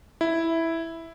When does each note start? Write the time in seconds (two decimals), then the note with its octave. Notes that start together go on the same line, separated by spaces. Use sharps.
0.21 E4